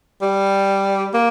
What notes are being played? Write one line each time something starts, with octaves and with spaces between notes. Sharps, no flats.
G3
A#3